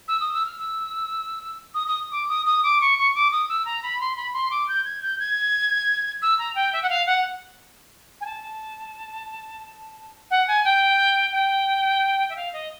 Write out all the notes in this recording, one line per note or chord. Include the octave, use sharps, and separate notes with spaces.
E6
D#6
E6
F6
E6
D#6
D#6
D6
D#6
D#6
D6
C#6
C#6
D6
D#6
E6
A#5
B5
C6
B5
C6
D6
G6
G#6
G6
G#6
E6
A#5
G5
E5
F#5
F5
F#5
G#5
A5
F#5
G#5
G5
G5
E5
F5
D#5